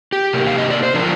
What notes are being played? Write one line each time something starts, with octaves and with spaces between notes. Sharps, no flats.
G4
C3 D#3 A#3
F5
D#5
D5
C5
D3 F3 A#3 D4 F4 A#4